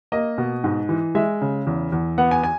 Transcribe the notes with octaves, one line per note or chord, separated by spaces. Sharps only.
A#3 D#5
B2
G#2
E3
G#3 E5
C#3
E2
E2
B3 F#5
G#5
G#5